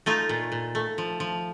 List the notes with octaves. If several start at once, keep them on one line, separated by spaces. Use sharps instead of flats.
A3 D#4 F4
A#2
A#2
A3
F3
F3